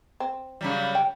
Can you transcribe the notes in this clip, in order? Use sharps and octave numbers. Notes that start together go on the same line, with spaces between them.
C4
C#3 F#3 G3
G5